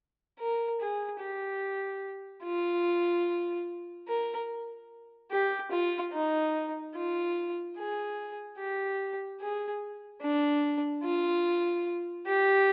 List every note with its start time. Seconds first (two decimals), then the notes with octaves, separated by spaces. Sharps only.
0.40 A#4
0.80 G#4
1.20 G4
2.44 F4
4.08 A#4
5.31 G4
5.71 F4
6.13 D#4
6.95 F4
7.77 G#4
8.58 G4
9.41 G#4
10.22 D4
11.04 F4
12.27 G4